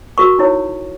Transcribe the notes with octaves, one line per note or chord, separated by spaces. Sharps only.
F#4 A#4 C#6
D#4 E4 C#5